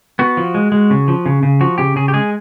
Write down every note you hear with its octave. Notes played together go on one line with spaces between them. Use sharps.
B3 F#4
F3
G#3
G#3
C#3
F3
C#3
C#3
F3 F#4
C#3 G4
C#3 G#4
G4
G#3 G#4